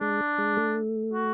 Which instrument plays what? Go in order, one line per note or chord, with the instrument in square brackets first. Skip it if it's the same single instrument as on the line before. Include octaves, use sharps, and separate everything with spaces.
[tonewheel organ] G#3 [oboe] D4
[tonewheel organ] G#3
A3
[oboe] F#4